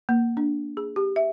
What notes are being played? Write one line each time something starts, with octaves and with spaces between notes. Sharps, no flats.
A#3
D4
G#4
G4
E5